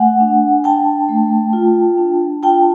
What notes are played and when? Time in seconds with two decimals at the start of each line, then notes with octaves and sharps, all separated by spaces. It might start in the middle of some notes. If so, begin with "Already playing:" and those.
Already playing: A3 F#5 G#5
0.20 D4
0.64 D4 G5 A5
1.09 A3
1.53 F4
1.98 D4
2.43 F4 G5 A5